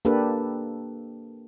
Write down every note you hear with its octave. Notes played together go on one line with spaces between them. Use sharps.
A#3 D4 G4 A4 B4